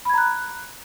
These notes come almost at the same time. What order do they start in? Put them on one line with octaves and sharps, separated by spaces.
B5 G#6 A#5 F#6